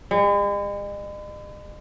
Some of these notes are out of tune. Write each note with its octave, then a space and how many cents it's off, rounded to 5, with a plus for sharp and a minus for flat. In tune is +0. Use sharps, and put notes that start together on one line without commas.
G#3 -45